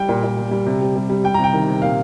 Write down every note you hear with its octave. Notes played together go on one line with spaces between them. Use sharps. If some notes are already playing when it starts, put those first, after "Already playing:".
Already playing: G3 G5
A#2
A#2
G3
G3
C3
C3
G3
G3
G3 G5
C3 A#5
G5
D#3
C3
A#2 F5